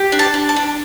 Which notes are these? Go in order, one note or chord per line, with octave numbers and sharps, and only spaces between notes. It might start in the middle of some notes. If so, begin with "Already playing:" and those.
Already playing: G4
D4
A5
D4
A5
D4